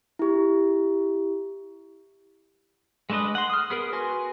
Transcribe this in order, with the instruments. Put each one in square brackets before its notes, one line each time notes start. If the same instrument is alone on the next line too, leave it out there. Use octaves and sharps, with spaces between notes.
[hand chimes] E4 G4
[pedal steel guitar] G#3 A3 D4 B4 D#5
F#5 C6
D#6 F6
B3 G#4 A#4
F#4 B4 G#5 C6